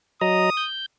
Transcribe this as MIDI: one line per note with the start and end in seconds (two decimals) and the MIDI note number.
0.21 0.50 54
0.21 0.50 75
0.21 0.50 82
0.21 0.67 87
0.57 0.86 91